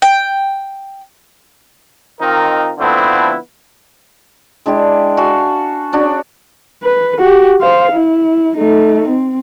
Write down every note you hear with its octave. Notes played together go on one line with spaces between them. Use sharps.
G5
D#3 C4 D#4 F4 A#4
D3 F3 A3 B3 C4 E4
G#3 D4 E4 G4
F#4 A4 F5 G#5
C#4 D4 F#4 G#4
B4
F#4 G4
C5 F5
E4
A3 D#4
C4